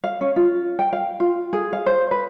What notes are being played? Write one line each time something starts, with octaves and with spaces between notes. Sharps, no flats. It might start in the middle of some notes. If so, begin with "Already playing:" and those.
F5
C#4
F4
G5
F5
F4
G#4
F5
C5
B4